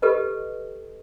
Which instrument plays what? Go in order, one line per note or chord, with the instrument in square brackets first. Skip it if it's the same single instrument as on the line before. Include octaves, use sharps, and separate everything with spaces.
[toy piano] G4 A4 B4 D#5